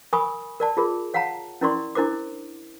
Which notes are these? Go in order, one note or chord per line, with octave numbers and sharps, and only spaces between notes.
A#4 G#5 B5 C#6 D#6
A#4 D5 A5
F4 G#4 A#4
C#5 F5 F#5 A5 A#5
C#4 E4 A#4 D5 C6 C#6
D4 E4 A#4 C5 D6